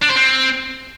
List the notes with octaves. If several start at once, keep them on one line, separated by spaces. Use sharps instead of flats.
D4
C5
C4